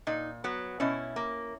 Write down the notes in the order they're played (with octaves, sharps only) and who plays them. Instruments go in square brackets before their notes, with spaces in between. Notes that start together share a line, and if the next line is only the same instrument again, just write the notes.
[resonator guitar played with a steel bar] A#2 D#4
F#3 B3
B2 C#4 E4
A#3